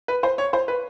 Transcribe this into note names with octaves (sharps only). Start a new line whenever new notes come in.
B4
C5
C#5
C5
B4